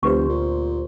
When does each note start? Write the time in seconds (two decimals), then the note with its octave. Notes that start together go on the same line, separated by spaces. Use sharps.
0.03 F1 D2 G4 B4 C5 C#6
0.28 A#2